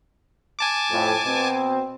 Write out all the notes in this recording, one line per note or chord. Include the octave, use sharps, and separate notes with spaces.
G#5 A5 D6
F2 A2
B2 C4